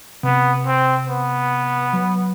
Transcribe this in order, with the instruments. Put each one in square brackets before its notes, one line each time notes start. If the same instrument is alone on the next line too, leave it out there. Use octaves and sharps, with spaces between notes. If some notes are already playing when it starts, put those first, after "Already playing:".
[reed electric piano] C3 [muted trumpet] B3
[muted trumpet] C4
B3
[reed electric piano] F#3